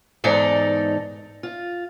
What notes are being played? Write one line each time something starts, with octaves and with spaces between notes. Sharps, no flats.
E2 G#2 D#4 A4 D5
F4